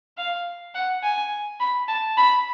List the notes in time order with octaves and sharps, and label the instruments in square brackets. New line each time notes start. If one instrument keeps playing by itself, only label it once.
[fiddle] F5
F#5
G#5
B5
A5
B5